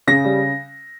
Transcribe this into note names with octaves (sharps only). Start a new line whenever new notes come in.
C#3 A#6
G3